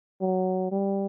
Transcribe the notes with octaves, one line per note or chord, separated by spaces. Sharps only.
F#3
G3